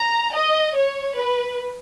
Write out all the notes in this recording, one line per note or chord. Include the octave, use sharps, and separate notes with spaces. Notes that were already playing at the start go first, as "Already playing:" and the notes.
Already playing: A#5
D#5
C#5
B4